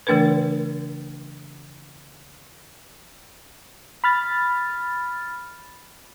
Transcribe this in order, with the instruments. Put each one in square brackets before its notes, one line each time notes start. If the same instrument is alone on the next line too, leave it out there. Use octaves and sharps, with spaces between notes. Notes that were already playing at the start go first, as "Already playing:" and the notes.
[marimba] C#3 E3 A3 D4 A#4 B4
[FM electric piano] B5 F6 A6